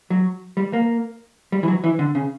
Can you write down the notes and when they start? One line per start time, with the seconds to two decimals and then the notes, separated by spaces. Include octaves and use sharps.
0.10 F#3
0.57 G3
0.73 A#3
1.52 G3
1.63 E3
1.68 F#3
1.84 E3
1.99 D3
2.15 C#3